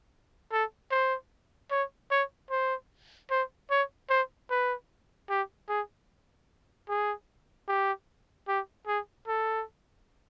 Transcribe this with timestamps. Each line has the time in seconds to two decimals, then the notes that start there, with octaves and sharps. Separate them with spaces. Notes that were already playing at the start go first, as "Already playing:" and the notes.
0.52 A4
0.91 C5
1.71 C#5
2.11 C#5
2.50 C5
3.30 C5
3.70 C#5
4.10 C5
4.50 B4
5.30 G4
5.69 G#4
6.89 G#4
7.68 G4
8.48 G4
8.87 G#4
9.28 A4